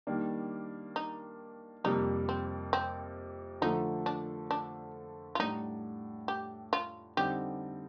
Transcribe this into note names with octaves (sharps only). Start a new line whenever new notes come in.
D#3 G3 A#3 D4
D#4
F2 C3 G3 A#3 D#4
C4
C4
D3 F3 A3 D#4
D4
D4
F4
A2 G3 D4 D#4
G4
F4
D3 G3 C4 D#4 G4